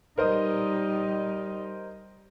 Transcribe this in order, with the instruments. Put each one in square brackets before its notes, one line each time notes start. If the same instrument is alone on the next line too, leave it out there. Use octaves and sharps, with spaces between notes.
[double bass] G3 D#4 [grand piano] A#4 C5 D#5